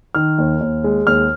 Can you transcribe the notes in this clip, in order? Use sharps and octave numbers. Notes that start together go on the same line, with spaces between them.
D#3 F6
D#2
D#2
G#3
D#2 F6